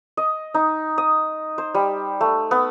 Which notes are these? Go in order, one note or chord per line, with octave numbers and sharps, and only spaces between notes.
D#5
D#4
D#6
C5
G3
A3
B3